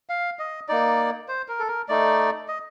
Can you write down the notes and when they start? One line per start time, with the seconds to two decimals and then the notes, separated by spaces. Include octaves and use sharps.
0.09 F5
0.39 D#5
0.68 A#3 D#4 D5
1.28 C5
1.48 A#4
1.59 A4
1.68 A#4
1.89 A3 D#4 D5
2.48 D#5